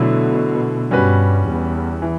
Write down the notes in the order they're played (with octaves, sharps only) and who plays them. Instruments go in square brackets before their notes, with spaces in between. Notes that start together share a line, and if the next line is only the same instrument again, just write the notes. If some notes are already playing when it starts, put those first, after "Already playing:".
Already playing: [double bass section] B2 [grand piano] D3 F#3 A3 E4
[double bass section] G2 [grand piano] G3 C#4 F#4 B4
[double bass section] E2
[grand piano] E3